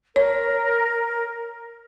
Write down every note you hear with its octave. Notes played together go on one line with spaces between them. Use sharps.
A#4 C#5